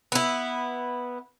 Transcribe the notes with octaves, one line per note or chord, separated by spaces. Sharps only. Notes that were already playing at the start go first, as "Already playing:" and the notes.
B3 E4